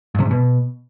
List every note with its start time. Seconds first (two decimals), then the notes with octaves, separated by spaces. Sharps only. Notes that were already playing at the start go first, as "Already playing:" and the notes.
0.15 G2
0.20 C3
0.25 G#2
0.31 B2